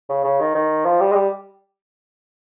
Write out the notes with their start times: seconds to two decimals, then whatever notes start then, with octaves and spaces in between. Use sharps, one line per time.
0.09 C#3
0.24 C#3
0.40 D#3
0.55 D#3
0.86 F3
1.00 G3
1.11 G#3
1.15 G3